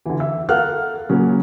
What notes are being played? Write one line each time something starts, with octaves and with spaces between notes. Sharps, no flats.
D3 E3
E5
A4 A#4 F5 F#5 F6 F#6
A#2 C#3 F#3 A#3 C#4